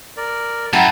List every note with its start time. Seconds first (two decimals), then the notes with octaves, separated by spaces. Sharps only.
0.17 A#4 D5
0.73 F#2 E4 F#5 G5 A5 A#5